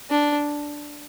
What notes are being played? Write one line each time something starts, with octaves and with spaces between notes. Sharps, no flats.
D4